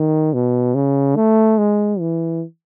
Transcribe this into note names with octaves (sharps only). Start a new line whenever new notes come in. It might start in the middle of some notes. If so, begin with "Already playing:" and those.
Already playing: D#3
B2
C#3
A3
G#3
E3